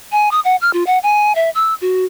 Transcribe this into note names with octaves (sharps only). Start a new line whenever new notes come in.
G#5
D#6
F#5
F6
F4
F#5
G#5
E5
E6
F#4